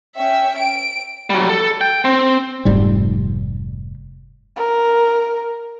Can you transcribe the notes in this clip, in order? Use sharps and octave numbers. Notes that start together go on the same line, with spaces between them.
C#4 E5 G5
D7
F#3 G3
A4
G5
C4
F1 G#2 G3
A#4